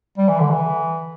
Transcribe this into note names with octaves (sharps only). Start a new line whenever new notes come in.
G3
E3
D3
E3